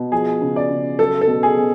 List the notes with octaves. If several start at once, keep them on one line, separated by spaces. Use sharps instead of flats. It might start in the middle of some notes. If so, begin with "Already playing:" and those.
Already playing: B2
F3 G#4
C#3
D5
C#3
F#3 A4
A4
B2
G#4
B2